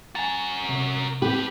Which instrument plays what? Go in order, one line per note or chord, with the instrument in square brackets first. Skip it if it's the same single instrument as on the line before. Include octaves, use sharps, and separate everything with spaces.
[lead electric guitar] F#4 A#4 [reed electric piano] G#5 A6
[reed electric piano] C3
[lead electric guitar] F2 B4 [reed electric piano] C4 [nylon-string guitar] G4